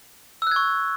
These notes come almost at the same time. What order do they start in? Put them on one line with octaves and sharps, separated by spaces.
E6 F#6 G#6 C#6